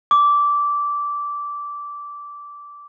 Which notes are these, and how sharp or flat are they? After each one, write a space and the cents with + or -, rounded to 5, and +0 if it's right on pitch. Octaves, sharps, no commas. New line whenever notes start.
D6 -15